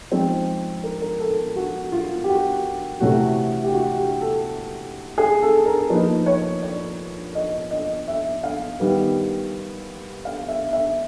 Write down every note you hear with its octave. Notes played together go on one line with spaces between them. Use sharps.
F3 G#3 C4 D#4 C5
A#4
A#4
A4
F#4
F4
G4
F#4
C3 E3 A3 C#4 F#4
G4
F#4
G4
A4
G#4
A4
A#4
F3 A#3 D#4 B4
C#5
D5
D#5
D#5
E5
F5
D#3 G3 B3
F5
E5
E5